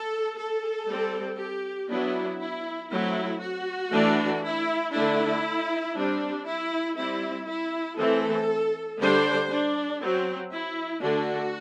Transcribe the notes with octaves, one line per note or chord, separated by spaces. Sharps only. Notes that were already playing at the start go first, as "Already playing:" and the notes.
Already playing: A4
A4
G3 C4
G4
F#3 B3 D4 E4
E4
F#3 A3 C4 E4
F#4
E3 A3 D4
E4
D3 A3 D4 E4
G3 C4 D4
E4
G3 C4 E4
E4
E3 A3 C4 A4
D3 G3 D4 C5
D4
F#3 C4
E4
D3 A3 D4 F#4